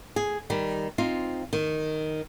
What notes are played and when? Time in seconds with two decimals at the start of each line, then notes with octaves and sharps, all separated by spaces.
0.16 G#4
0.50 D#3 G3
0.98 C4 D#4 F4
1.53 D#3